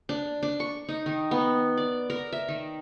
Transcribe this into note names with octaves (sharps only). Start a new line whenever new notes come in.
D4
D4
C#6
D#4
D#3
B3
D5
A#4
E5
D#3